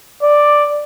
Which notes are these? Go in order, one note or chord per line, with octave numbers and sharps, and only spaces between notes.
D5